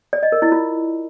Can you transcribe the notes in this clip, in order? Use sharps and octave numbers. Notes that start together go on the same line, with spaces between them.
D5
D#5
A#4
E4
F4